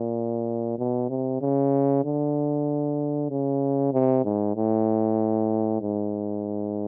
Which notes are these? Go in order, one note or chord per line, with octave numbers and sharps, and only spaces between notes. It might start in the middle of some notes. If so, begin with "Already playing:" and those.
Already playing: A#2
B2
C3
C#3
D3
C#3
C3
G#2
A2
G#2